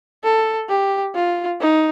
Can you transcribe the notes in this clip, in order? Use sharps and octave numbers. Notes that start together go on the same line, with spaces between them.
A4
G4
F4
D#4